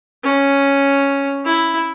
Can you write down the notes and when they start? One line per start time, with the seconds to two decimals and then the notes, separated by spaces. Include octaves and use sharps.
0.24 C#4
1.45 E4